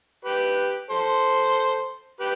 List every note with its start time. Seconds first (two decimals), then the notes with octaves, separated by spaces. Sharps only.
0.25 G4 B4
0.90 A4 C5
2.20 G4 B4